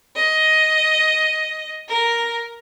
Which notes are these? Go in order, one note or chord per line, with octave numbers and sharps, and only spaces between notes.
D#5
A#4